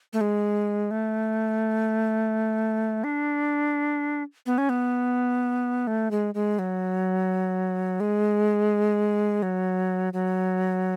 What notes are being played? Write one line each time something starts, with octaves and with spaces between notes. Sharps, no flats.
A3
G#3
A3
D4
B3
C#4
B3
A3
G#3
G#3
F#3
G#3
F#3
F#3